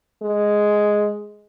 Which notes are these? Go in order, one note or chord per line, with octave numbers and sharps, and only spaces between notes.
G#3